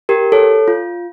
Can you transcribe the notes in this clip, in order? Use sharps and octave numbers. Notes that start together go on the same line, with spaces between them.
G4 A#4
A4 C#5
F4